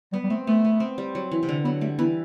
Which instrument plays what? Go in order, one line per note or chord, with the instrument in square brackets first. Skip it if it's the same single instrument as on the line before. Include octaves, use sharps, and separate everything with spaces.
[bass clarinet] G3 [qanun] B3
[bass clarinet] G3
[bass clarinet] A3 [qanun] C4
[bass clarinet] A3 [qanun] B3
[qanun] B3
C4
G3
F#3
E3
C3
D3
[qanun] F#3 [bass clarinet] B3
[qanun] G3 [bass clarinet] A3
[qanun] E3 [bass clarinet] B3